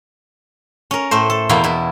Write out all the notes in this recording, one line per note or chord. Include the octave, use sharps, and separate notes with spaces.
C#4 A#4
A2 A3 C5
A4
E2 B2 A#3 E4 F5 G5
B2 E4